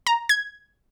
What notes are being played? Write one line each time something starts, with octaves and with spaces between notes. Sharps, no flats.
A#5
G#6